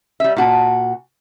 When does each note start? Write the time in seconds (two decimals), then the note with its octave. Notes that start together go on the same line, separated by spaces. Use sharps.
0.20 G3 E5
0.37 A#2 F#4 A5